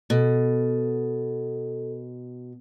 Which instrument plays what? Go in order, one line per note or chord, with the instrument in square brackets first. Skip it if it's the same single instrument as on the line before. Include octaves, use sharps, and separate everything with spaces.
[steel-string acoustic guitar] B2 [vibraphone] A4